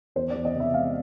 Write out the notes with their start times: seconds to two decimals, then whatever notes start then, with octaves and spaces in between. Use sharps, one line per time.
0.16 E2 C5
0.30 D5
0.35 E2
0.45 D#5
0.55 C3
0.60 E5
0.74 G#3 F5